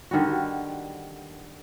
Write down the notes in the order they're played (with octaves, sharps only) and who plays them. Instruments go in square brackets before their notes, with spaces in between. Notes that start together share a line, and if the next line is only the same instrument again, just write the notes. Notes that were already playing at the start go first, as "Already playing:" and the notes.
[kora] D3 D#3 G3 F#4